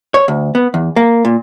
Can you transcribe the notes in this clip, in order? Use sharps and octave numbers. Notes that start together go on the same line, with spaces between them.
C#5
D2
B3
E2
A#3
A#2